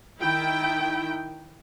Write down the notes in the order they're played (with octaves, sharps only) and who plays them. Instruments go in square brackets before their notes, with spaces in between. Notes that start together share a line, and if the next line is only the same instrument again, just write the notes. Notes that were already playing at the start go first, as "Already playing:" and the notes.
[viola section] D#3 E4 G5